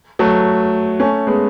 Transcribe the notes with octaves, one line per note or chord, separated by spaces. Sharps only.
F#3 A3
A3 C#4
G#3 B3